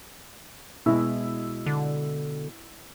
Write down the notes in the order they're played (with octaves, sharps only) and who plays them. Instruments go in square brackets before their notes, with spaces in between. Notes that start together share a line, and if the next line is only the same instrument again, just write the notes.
[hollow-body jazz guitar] B2 G#3 [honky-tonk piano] E4
[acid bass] D3